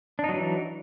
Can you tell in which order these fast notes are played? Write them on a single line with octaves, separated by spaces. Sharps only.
D4 D#4 F#3 E3